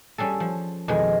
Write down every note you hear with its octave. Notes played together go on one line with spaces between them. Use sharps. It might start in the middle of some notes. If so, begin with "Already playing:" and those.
G3 C#4 G#4 A4
F3
F2 B2 D#3 G#3